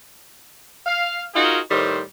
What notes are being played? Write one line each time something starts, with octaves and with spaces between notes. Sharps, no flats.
F5
D#4 F4 F#4 G#4 A#4
A2 D#3 G3 C5